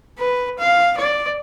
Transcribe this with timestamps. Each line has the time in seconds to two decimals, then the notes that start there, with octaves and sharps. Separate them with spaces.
0.19 B4
0.58 F5
0.98 D5